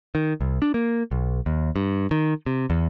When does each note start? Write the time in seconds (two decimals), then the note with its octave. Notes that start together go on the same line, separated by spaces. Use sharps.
0.15 D#3
0.41 C2
0.62 D4
0.74 A#3
1.11 B1
1.46 D#2
1.76 G2
2.11 D#3
2.46 C3
2.70 E2